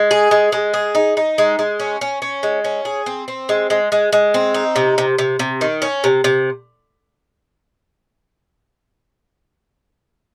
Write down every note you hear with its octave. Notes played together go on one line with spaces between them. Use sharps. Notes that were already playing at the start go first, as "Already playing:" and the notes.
Already playing: G#3
G#4
G#3
G#3
G#4
D#4
D#4
G#3
G#3
C#4
C#4
C#4
G#3
C#4
G#4
C4
C4
G#3
G#3
G#3
G#3
C4
D#4
C3
C3
C3
C3
D#3
C#4
C3
C3